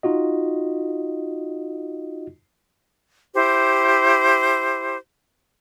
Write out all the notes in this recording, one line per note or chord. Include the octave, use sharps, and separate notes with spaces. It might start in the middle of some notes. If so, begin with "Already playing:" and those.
D#4 F4 F#4 D#5
E4 G4 C5